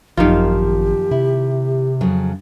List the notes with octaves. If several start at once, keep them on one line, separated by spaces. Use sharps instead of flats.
G#1 F#2 D#3 F3 A#3 F4 G4
C3 E4
F2 C#3 F#3